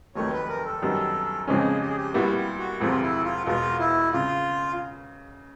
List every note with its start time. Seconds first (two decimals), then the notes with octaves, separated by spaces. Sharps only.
0.15 F1 D#2 D#3 F#3 A3 C#5
0.32 B4
0.49 A#4
0.65 A4
0.82 F#2 D#3 G3 B3
1.48 F2 C#3 F3 G#3 C#4 G#4
1.81 G4
1.89 G#4
1.97 G4
2.14 A#2 G3 B3 E4 F#4
2.36 G4
2.58 F#4
2.80 E1 D2 C3 F3 F4
3.02 E4
3.24 F4
3.46 E1 E2 B2 F4
3.79 E4
4.12 C#3 F4